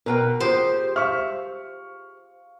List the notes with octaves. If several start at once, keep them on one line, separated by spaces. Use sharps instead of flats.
B2 A#4 B4 G5
F4 G4 G#4 C5
E5 F5 C#6 F6